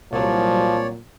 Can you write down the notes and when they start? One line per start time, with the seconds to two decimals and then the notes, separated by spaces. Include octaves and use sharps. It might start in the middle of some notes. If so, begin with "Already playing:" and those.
0.12 C2 A#2 F3 F#3 C#5 D5